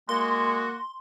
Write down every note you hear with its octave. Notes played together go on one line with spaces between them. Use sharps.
G#3 A#3 F#4 C6